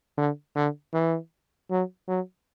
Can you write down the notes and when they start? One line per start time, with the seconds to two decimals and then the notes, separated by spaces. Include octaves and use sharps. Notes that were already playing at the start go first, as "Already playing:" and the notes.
0.18 D3
0.56 D3
0.94 E3
1.71 F#3
2.08 F#3